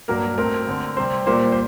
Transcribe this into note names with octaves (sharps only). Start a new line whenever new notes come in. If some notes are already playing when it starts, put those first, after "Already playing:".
G2 F#3 A#3 A#4
A2 A3 C4 A#4
D3 A3 C4
C3 G3 C4 C5
A#2 G3 A#3 C5
C5